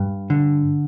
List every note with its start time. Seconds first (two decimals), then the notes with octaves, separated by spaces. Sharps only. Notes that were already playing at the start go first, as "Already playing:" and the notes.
Already playing: G2
0.30 D3